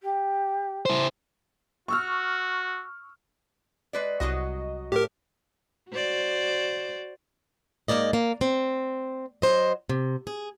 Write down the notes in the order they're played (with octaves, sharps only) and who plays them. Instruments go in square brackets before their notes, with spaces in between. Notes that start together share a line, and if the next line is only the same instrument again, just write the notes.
[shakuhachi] G4
[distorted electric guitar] E4 C5
[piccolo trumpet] F#4 [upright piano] C#6 E6 F6
[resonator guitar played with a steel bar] G#3 B4 D5
[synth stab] C2 D#5 [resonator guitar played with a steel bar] F#3 F#4
[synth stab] A2 [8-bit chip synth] G4 A#4
[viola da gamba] F#4 C5 D5
[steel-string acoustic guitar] G#2 F#3 A#3 D5 D#5
A#3
C4
F#3 C5 D#5
C3
G#4